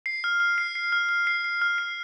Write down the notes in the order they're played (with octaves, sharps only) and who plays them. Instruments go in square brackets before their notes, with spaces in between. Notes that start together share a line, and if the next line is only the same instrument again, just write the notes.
[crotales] C7
F6
F6
C7
C7
F6
F6
C7
C7
F6
C7